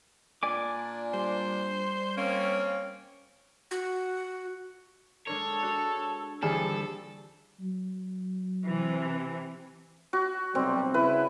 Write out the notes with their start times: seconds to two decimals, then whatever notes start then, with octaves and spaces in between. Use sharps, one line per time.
0.43 A#2 D4 D5 G#5 D6
1.14 G3 C5
2.17 A#3 C4 C#4
3.71 F#4
5.27 G#3 D4 A4 A#4 C#5
5.62 D4 F#4 G#4
6.43 D#1 D3 E3 G3 G#4 A4
7.61 F#3
8.64 C3 E3
10.13 F#4
10.55 B1 C3 G3 C4
10.94 C#3 E4 B4